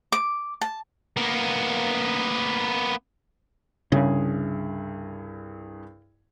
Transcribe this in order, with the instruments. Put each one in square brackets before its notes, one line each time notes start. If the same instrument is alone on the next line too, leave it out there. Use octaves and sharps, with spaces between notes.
[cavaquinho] D6
A5
[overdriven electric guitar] A#3 B3
[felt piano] C2 G2 G#4 [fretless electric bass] C#3